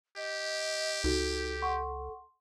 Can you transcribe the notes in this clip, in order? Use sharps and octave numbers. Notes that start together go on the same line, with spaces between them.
G4 D#5
C#2 D#4 F#4 A4
F#5 C6 C#6